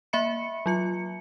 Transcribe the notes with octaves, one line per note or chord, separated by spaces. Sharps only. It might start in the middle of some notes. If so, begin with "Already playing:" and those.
A#3 E5 B5 C#7
F#3 F4 C#7